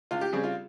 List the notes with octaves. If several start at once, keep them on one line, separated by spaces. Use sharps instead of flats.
C#2 F4
G4
C#3 G3 C4 G#4
F4